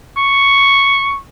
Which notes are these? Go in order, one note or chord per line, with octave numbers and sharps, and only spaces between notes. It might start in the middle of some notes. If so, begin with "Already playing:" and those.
C#6